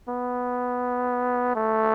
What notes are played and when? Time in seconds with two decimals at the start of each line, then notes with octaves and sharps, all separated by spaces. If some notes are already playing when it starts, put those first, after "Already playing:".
0.08 B3
1.55 A3